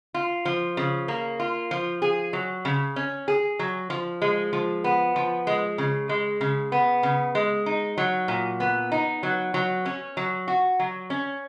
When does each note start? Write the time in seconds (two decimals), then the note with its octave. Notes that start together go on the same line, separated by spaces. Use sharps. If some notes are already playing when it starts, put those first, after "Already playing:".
0.14 F4
0.45 F3
0.77 C#3
1.08 A#3
1.40 F4
1.71 F3
2.02 G#4
2.33 F#3
2.65 C#3
2.96 C#4
3.28 G#4
3.59 F#3
3.90 F3
4.22 G#3
4.53 F3
4.84 B3
5.16 F3
5.47 G#3
5.78 C#3
6.09 G#3
6.41 C#3
6.72 B3
7.03 C#3
7.35 G#3
7.66 D#4
7.98 F#3
8.28 A#2
8.60 B3
8.92 D#4
9.23 F#3
9.54 F#3
9.85 C#4
10.17 F#3
10.48 F#4
10.79 F#3
11.10 C#4